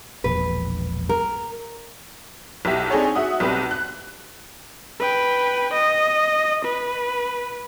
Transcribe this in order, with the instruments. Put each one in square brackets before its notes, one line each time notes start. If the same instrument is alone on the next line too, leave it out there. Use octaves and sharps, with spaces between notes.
[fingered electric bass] E1 A#1 [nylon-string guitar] B4
[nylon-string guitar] A#4
[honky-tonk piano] B1 E4 G4 B6
C4 D4 D#4 G#4 A4 C#5
F#4 E5 F#5 D#6
B1 G3 C4 G4 B4
F#6
[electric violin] B4 G5
D#5
B4